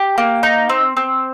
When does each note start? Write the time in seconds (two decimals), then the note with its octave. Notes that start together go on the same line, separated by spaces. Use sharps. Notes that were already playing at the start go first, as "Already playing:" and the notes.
Already playing: G4
0.18 A#3
0.43 D#4
0.69 C4
0.97 C4